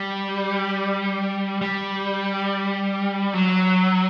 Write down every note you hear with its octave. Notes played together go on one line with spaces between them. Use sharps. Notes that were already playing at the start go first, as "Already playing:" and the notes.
Already playing: G3
G3
F#3